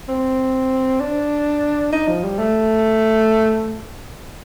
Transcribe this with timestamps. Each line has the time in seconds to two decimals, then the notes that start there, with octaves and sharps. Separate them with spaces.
0.09 C4
1.00 D4
1.92 D#4
2.08 F3
2.23 G3
2.38 A3